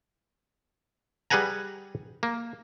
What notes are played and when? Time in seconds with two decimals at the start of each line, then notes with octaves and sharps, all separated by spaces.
1.30 G3 G#4 B4 F#5 G#5 A#5
2.23 A#3